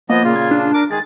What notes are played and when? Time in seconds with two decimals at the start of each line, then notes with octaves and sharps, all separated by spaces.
0.10 F3 A#3 B3 D#5
0.24 A#2 C#3 F4
0.36 G#6
0.51 D4
0.74 A#4 D6
0.91 D#3 G#3 G#4 A6